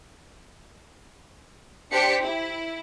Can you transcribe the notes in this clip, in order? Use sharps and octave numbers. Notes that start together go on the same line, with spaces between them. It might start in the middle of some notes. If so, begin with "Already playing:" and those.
D4 G4 C5 B6 C#7
E4